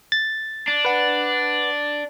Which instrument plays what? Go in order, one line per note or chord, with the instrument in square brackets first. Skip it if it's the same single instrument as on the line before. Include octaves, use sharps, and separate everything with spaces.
[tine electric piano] A6
[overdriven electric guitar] D4
[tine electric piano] B4 F#5